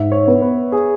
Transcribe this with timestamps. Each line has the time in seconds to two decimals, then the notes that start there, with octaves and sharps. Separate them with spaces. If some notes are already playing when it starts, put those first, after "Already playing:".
Already playing: G#2 E5
0.12 C#5
0.27 B3
0.42 B4
0.72 G#4